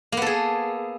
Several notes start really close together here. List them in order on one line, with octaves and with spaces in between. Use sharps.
A#3 B3 A4 G#4